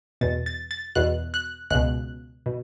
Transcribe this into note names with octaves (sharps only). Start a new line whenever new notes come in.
E2 B2 A6
A6
A6
E2 B2 F#6
F#6
C#2 B2 F#6
B2